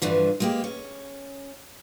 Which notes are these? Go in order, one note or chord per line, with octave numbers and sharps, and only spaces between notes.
G2 D3 E3 F3
G#3 A#3 G4
C#4